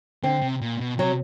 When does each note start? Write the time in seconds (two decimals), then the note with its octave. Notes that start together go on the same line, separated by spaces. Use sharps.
0.23 D3 C4
0.42 C3
0.61 A#2
0.80 B2
0.99 C3 F#3